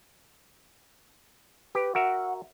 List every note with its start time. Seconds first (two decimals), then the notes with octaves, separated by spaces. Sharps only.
1.75 G4 B4
1.95 F#4 A#4 E5 F#5